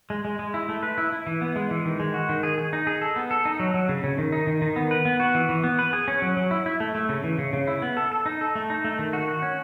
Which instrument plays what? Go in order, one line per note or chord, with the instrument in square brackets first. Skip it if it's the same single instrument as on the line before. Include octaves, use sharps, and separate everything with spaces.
[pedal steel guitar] G#3
G#3
G#3
E4
A3
B4
E4
E4
E3
B3
G#3
E3
D#3
G#3
F#4
D#3
G#4
G#4
D#4
G#4
A4
B3
A4
D#4
F#3
F#3
C#3
C#3
D#3
D#4
D#3
D#3
B3
B4
B3
F#4
E3
E3
B3
B4
G#4
C#4
F#3
F#3
E4
E4
A3
A3
C#3
E3
C#3
C#3
E4
B3
A4
A4
D#4
A4
A3
D#4
A3
D#3
F#4
F#4
C#4